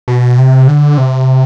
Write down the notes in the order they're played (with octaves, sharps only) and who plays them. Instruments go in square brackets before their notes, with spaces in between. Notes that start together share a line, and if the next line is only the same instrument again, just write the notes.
[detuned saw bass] B2
C3
D3
C3